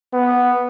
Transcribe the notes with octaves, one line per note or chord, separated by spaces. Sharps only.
B3